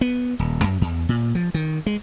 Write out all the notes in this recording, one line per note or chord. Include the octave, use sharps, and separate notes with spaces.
B3
D#1
F#2
E2
A#2
F3
D#3
G#3